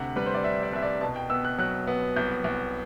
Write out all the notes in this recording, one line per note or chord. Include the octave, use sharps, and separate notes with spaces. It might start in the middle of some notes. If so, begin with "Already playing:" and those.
Already playing: D2 C3 F#5
G3 B4
C5
D5
D4 E5
D5
C2 E5
D5
B2 A5
G5
B3 E6
F#6
F#3 F#6
B3
C2 G6
C2